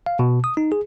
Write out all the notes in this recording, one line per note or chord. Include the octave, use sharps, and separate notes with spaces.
F5
B2
D#6
D#4
G#4